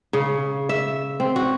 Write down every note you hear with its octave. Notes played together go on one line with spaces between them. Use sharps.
C#3
E5
C4
F#4